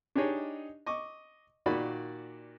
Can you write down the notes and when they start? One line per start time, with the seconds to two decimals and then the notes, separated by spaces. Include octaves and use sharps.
0.16 D4 D#4 G4 G#4 C#5 D#5
0.86 D#5 C#6 D6
1.66 A#2 D#3 A#3 F#4 D5 B5